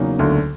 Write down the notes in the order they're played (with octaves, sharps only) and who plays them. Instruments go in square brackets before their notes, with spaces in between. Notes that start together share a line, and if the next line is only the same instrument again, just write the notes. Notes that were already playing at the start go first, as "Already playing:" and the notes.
Already playing: [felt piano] E2 C#3 F#3 A#3 D#4
[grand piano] D2 D3